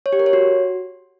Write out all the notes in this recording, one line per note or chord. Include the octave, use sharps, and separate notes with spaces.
C#5
G4
A#4
C#5
F#4